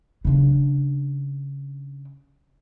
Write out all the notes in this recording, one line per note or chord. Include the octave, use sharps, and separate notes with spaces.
C#3 D4